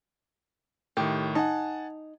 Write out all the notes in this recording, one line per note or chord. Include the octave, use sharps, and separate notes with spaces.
A2 D#3 G4
D#4 F#5 G#5 A5